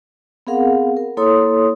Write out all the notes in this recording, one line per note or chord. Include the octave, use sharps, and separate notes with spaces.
B3 C4 G#4 A#4 F5 F#5
A#4
A#3 E4 A4 C#5 C6 D#6